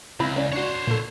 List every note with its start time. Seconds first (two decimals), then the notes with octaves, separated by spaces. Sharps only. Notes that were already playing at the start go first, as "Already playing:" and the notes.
0.20 C#2 C4 E4 B5
0.36 C#4 D5
0.52 D4 F#4 C5 C#5
0.87 A#2 A4